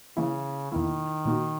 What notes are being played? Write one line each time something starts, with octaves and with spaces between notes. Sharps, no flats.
C#3 E3 A#3 E4
E2 B2 D#3 A#3 E4
A#2 A#3 D#4 F#4